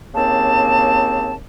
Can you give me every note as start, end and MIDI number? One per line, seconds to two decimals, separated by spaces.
0.15 1.34 39
0.15 1.34 49
0.15 1.34 58
0.15 1.34 60
0.15 1.34 81